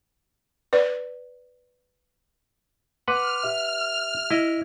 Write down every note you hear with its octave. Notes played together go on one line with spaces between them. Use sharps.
B4 D5
B4 F#5 C6 D6 F6
G4 E5
E4 D#5